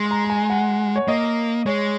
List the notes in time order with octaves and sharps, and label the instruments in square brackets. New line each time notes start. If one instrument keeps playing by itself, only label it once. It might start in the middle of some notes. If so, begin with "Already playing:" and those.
Already playing: [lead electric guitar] G#3 [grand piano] C6
[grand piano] A#5
A#5
G#5
F#5
C#5
[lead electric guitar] A#3 [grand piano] D#5
[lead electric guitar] G#3 [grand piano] C#5